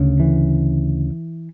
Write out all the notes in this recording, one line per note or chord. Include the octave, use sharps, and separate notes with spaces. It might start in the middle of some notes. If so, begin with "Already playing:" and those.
Already playing: D2 C#3
E3